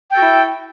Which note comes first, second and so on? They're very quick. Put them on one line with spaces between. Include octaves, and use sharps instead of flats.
G5 A4 F#4 E4